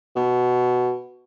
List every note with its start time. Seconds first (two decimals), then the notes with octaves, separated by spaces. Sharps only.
0.16 B2